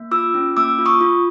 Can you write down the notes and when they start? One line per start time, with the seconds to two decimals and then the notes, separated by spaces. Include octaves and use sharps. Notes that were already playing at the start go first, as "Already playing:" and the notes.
Already playing: A#3
0.11 F4 D6 E6
0.34 C#4
0.57 A#3 D6 E6
0.79 F4
0.86 C#6 D#6
1.01 F4